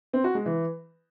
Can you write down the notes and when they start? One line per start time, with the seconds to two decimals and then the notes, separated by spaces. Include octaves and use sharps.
0.13 C4
0.24 F#4
0.35 G#3
0.46 E3